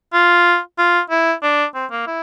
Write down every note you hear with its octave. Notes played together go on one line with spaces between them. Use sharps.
F4
F4
E4
D4
C4
A#3
E4